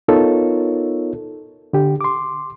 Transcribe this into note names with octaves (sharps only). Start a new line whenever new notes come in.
B3 D#4 F4 A4 A#4 C#5
D3 G4
C6 D6